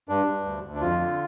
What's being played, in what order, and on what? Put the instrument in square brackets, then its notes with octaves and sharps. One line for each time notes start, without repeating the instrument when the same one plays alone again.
[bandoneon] G2 D4
G2
D2
D2
D4
F2 F4
D3